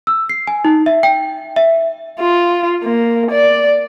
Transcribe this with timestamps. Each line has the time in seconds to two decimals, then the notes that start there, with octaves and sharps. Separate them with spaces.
0.07 E6
0.29 C7
0.47 G#5
0.65 D#4
0.86 E5
1.03 G5
1.56 E5
2.20 F4
2.84 A#3
3.31 D5